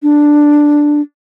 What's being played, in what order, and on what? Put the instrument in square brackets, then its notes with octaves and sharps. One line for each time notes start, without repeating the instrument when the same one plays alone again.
[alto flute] D4